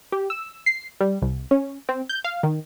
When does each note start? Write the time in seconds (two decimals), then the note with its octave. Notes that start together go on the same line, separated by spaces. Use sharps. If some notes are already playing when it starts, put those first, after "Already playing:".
0.12 G4
0.30 E6
0.66 C7
1.01 G3
1.22 C2
1.51 C#4
1.89 C4
2.09 G6
2.24 F5
2.43 D#3